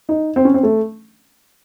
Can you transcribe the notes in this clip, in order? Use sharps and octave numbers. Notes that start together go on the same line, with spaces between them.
D#4
C4
C#4
C4
A3